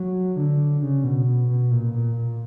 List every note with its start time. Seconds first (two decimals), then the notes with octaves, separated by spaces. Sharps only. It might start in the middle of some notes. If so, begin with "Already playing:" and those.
Already playing: F#3
0.36 D3
0.82 C#3
1.04 B2
1.26 B2
1.48 B2
1.71 A#2
1.93 A#2
2.16 A#2